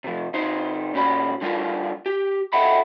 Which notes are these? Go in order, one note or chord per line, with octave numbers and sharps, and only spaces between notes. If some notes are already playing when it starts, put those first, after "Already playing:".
C3 F3
C3 D#4 C5
A#2 C#4 F#4 B5
D3 G3 F4 A#4
G4
A4 D#5 E5 F#5 G5 B5